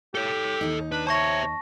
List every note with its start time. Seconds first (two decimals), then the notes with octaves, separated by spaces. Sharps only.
0.15 G4 A4 C#5
0.61 D#2 D#4
0.92 D4 B4
1.07 C5 C#5 E5 A5 C#6 A#6